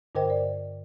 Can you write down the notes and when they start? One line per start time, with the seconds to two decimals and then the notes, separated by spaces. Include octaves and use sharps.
0.15 G2 D3 A#4 C5 D#5 G5
0.30 D5